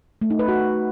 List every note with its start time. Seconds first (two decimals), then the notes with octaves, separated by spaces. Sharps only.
0.22 A3
0.30 D#4
0.39 B4
0.48 F#4